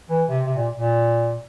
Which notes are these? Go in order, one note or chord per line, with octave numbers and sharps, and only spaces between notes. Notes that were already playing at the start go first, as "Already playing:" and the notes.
E3
C3
C3
A#2
A#2